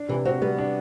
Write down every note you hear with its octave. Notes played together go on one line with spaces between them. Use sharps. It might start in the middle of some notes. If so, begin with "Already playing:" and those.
Already playing: D4
C3 E3
C4 F#4
G3 B3
D4